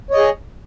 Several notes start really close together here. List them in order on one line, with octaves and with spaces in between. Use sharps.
C#5 D#5 G#4